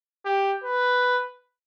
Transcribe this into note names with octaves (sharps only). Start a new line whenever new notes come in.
G4
B4